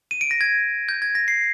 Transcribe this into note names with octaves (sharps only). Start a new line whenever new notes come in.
D#7
D7
A#6
G#6
G6
G#6
A#6
C7